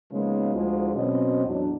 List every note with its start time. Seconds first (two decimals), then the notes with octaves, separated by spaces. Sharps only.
0.12 C#3 F3 G#3 A#3 B3 D#4
0.55 D2 F3 G#3 E4 F4 G#4
0.96 B2 F#3 C4 C#4 D#5
1.46 E2 A2 F#3 D4